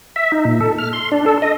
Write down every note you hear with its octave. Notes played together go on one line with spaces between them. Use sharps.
E5
D#4
A#2
A4
F6
C6
D4
A4
D#5